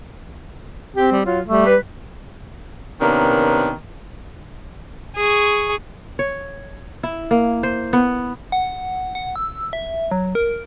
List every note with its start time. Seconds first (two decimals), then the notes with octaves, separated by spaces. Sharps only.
0.96 C4 G4
1.12 G3
1.25 F#3 F4
1.47 G3 A3
1.66 B4
3.01 C3 D#3 A#3 B3 C#4 D4
5.16 G#4 C#6
6.19 C#5
7.03 E4
7.31 A#3
7.63 C5
7.93 B3
8.52 F#5
9.15 F#5
9.36 E6
9.73 E5
10.11 F#3
10.35 A#4